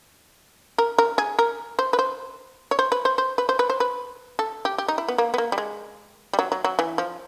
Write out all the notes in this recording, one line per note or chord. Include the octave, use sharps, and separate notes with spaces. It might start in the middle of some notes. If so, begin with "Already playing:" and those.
A#4
A#4
G#4
A#4
C5
B4
C5
C#5
C5
B4
C5
C5
B4
C5
B4
C5
B4
A4
G4
G4
D#4
E4
B3
A#3
B3
A#3
G3
G#3
G3
F#3
F#3
F#3
E3
F3